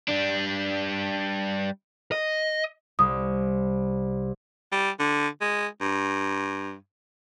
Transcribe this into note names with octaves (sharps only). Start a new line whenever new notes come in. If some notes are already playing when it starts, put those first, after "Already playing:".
G3 D4
D#5
C2 D#6
G3
D3
G#3
G2